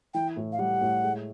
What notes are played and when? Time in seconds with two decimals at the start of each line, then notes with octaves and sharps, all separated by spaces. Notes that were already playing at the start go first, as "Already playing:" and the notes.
0.14 E3 G5
0.36 A2
0.52 F5
0.59 G3 F#5
0.81 A2
1.04 G#3